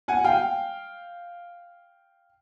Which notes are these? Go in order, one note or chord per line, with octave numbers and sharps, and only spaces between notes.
F#5 G#5
F5 G5